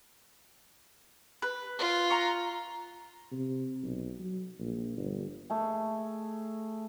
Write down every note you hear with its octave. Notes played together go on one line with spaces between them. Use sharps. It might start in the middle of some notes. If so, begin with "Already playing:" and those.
B4
F4
A#5 C#6
C3
B1
F#3
A#1
G1
A3 G#4